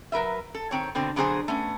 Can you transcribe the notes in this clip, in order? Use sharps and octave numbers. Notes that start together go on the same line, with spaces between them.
F#3 A#4 B4 E5
A4
D#3 C4 C#5
B2 D3 C4
B2 D3 F#3 G#4 C5 G#5
A3 B3 C#4